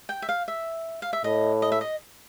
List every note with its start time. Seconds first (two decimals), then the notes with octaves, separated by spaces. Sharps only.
0.09 G5
0.22 E5
0.29 F5
0.48 E5
1.02 F5
1.13 E5
1.24 A2 D#5
1.62 D#5
1.72 E5
1.81 D#5